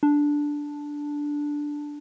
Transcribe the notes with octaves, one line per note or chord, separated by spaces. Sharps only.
D4